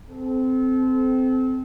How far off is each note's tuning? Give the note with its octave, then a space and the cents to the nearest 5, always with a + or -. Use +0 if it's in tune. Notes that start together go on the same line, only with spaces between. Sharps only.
C4 -15 A4 -35